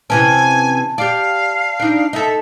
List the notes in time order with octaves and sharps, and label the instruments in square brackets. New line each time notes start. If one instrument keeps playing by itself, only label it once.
[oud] C3 E3 C#4 [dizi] G#5 [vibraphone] A5
[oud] G4 D5 [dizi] F5
[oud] D4 D#4
[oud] D#4 A4 [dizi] E5